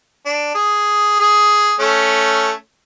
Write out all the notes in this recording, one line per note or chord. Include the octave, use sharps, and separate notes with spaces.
D4
G#4
G#4
A3 C#4